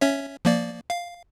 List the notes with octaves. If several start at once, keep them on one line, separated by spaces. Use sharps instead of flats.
C#4 C#5 E5
F3 A#3 D5
F5